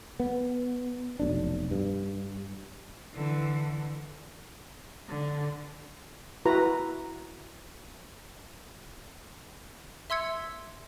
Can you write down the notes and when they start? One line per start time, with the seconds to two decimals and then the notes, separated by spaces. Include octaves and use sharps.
0.20 B3
1.20 F1 B1 D4
1.71 G2
3.14 D3 E3
5.09 D3
6.45 E4 F#4 B4 A#5
10.10 E5 C6 E6 G#6 C#7